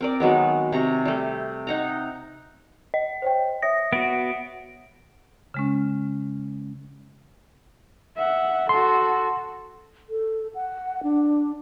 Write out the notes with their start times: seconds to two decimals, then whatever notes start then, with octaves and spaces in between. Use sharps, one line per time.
0.01 C4 A#4 D5
0.20 D#3 F#3 G#3 B3
0.72 C3 A#5 C#6
1.05 G3 A3
1.67 D#4 F#5 A#5
2.94 D#5
3.22 C5 C#5 G5
3.62 C#5 E5 D#6 A#6
3.93 B3 F#4 D7
5.54 C#3 G#3 C#4
8.16 E5 F#5
8.69 F#4 A4 C6
10.10 A4
10.55 F#5
11.03 D4